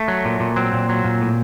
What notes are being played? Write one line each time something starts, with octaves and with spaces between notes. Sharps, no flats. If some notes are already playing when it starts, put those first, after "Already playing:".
Already playing: A3
F#3
A#2
A#2
F#3 C4
A#2
F#3
A#2
A2